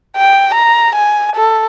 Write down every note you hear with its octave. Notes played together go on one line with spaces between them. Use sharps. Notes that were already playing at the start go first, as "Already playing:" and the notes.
G5
A#5
G#5
A4